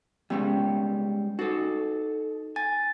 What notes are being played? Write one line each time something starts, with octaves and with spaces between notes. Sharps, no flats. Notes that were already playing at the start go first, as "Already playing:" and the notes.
G3 G#3 B3 C#4 G5
D#4 F#4 A4
G#5 A6